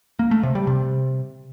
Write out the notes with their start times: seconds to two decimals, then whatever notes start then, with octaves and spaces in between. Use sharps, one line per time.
0.19 A#3
0.31 A3
0.43 C3
0.55 G3
0.67 C3